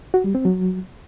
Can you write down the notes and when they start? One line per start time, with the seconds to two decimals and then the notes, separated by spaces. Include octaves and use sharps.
0.14 F#4
0.24 G3
0.35 C4
0.45 F#3